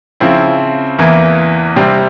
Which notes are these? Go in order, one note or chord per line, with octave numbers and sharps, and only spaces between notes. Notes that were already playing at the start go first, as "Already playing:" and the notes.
C#3 F3 C4 E4
E2 E3 A#3 E4
C3 G3 C4